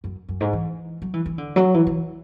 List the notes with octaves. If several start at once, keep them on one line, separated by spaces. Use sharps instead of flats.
F#2
F#2
G#2
E3
F#3
E3
E3
D3
F#3
E3
E3